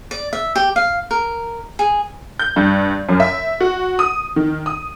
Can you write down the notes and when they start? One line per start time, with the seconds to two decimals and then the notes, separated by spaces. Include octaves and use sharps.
0.11 D5
0.33 E5
0.56 G4
0.76 F5
1.11 A#4
1.79 G#4
2.39 G6
2.56 G2
3.09 F#2
3.20 E5
3.60 F#4
3.99 D#6
4.36 D#3
4.66 D#6